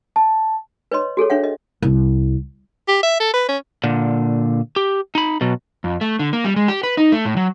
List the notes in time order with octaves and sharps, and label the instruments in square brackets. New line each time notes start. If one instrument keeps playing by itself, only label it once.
[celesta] A5
[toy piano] B4 C#5 D#5 C6
F#4 G#4 A4 C#5
D4 C#5 E5 F#5
D#5
[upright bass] C2
[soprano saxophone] G4
E5
A4
B4
C#4
[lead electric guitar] A#2 D3
G4
D#4 B5
B2 F#3
[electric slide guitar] F2
A3
D3
A#3
G3
G#3
G4
B4
D#4
A3
A2
F#3